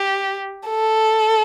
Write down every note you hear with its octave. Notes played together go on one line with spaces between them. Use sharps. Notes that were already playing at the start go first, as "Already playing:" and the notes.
Already playing: G4
A4